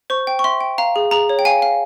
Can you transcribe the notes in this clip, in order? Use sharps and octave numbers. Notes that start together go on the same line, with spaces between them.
C5 C#6
G5
C#6
E5 C6
G5
F5 A#5
G#4
G#4 A#5
C#5
G5
F5 G#5
F5